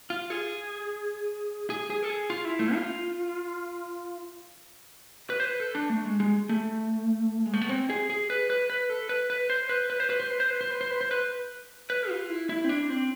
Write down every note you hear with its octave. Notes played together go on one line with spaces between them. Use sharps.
F4
G#4
G#4
G#4
A4
G#4
F4
E4
A3
F4
B4
C5
B4
A4
D4
A3
G#3
G#3
A3
G#3
A3
B3
C4
G#4
G#4
B4
B4
B4
A4
B4
B4
C5
B4
B4
C5
B4
C5
B4
C5
B4
C5
B4
C5
B4
C5
B4
B4
F4
E4
E4
C4
D4
C4